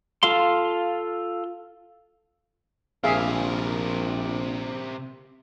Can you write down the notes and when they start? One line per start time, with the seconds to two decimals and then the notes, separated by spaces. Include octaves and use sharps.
0.23 F4 A4 F5 C6
3.04 A#1 C3 G#4 A#4 E5 F5